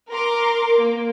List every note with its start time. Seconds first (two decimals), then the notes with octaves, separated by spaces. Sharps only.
0.10 A#4 A#5 C6 D6
0.79 A#3